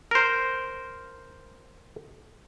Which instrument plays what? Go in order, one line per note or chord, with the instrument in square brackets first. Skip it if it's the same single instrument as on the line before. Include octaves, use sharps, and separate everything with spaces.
[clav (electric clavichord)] A#4 C5